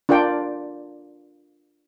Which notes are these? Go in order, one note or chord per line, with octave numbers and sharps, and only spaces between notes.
D4 F4 A#4 D5 G5